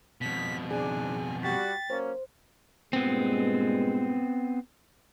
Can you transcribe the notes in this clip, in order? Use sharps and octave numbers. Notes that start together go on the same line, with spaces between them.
F2 B2 B6
G#2 D4 G#4 G#5
G3 F#4 G5 A6 B6
F#3 A#3 C#4 C5
G2 A#2 G#3 B3 C4